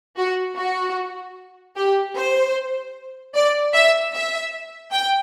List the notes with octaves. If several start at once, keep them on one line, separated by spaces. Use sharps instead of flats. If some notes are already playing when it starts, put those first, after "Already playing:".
F#4
F#4
G4
C5
D5
E5
E5
G5